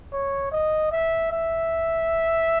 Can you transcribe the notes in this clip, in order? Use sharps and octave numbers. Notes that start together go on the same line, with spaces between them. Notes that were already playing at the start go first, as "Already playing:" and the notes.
C#5
D#5
E5
E5